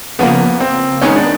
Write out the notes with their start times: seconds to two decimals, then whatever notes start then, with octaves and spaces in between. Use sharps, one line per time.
0.19 C#3 F3 A#3 B3
0.60 C4
1.02 D#3 G#3 B3 C#4 D#4
1.16 D4